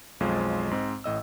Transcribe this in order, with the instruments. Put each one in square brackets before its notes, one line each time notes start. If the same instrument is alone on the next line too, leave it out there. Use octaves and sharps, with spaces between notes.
[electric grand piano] B1 F2 G#3 F4 C5
G#2 C4 D#5
A1 A2 D#5 E6